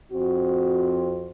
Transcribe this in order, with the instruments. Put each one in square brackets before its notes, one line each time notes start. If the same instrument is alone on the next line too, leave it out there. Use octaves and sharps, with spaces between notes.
[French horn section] F2 C4 F#4